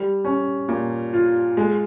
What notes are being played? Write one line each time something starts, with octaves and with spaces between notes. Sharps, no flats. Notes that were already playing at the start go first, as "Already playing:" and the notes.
Already playing: G3
C#4
A#2
F4
G#3